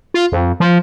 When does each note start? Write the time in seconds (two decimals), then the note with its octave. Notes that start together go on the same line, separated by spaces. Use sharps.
0.14 F4
0.32 F2
0.60 F3